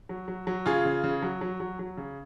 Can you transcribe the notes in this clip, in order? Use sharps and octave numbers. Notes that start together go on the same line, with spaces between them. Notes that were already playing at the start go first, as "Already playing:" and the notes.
F#3
F#3
F#3
C#3 F4 G#4
C#3
C#3
F#3
F#3
F#3
F#3
C#3